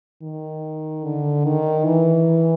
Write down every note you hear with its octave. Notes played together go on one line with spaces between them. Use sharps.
D#3
D3
D#3
E3